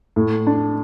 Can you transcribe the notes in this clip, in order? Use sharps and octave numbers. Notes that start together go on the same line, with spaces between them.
A2
D4